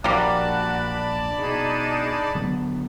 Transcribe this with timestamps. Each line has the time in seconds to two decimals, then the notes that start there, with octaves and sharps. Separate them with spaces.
0.04 A#1 G3 A#3 F#4 D5 A5 B5 F#6
1.38 B2 D4 D#4 G#4
2.35 D3 F#3 B3